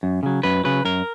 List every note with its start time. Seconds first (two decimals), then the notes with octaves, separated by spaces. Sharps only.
0.03 F#2
0.23 C#3 F#3
0.43 F#2 B4
0.64 C#3 F#3 B4
0.85 F#2 A#4